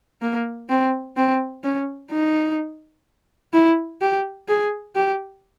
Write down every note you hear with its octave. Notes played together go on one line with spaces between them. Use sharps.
A#3
C4
C4
C#4
D#4
E4
G4
G#4
G4